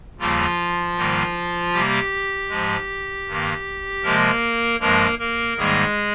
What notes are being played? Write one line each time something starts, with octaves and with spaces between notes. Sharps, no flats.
D#2 C#3 F3 G3 A#3 F4
G#2 D#3 G3 A#3
C3 G3 A#3 G4
G#2 F3 G#3
G2 D#3 A#3
C3 F3 G#3 A#3 A#4
G2 F3 G#3 A#3 A#4
A#3 A#4
G#2 D#3 G3 G#3 A#3 G#4